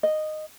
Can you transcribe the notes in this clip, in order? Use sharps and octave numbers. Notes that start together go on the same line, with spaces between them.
D#5